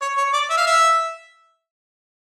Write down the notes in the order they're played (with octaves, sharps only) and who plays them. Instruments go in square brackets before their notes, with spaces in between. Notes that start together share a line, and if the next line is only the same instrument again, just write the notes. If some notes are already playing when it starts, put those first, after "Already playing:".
[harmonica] C#5
C#5
D5
E5
F5
E5